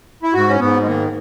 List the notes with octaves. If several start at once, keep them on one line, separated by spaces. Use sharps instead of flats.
E4
G#2 F#4
C#4
G#2 B3
G#3
D#3 A#3